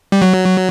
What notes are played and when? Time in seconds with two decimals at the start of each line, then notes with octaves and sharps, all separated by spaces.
0.12 G3
0.22 F#3